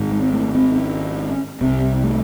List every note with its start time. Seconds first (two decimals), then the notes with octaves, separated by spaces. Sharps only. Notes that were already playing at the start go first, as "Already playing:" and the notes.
Already playing: G#1 G#2
0.12 G#3
0.22 C4
0.33 A3
0.55 C4
0.76 C#4
1.61 C2 C3 C4
2.04 A3